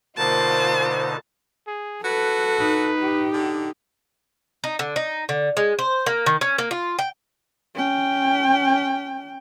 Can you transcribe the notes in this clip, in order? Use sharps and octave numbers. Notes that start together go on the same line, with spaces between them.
B2 D3 A#3 D#4 F4 C5 A5
G#4
F#4 A4 B4
D#4 B4
G4
D3
D#4
D3
D#4
D3
G#3
C5
A#3
D#3
C#4
A#3
F4
G5
C#4 G5